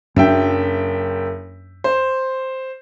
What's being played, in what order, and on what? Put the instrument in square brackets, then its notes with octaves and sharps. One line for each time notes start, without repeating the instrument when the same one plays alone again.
[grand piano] F#1 E5 G5 [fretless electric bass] F#2 D4
[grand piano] C5